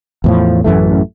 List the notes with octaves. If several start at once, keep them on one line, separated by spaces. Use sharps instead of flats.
E2 A2 F3
A1 F#2 E3 A3